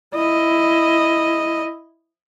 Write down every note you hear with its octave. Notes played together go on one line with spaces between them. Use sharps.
E4 D#5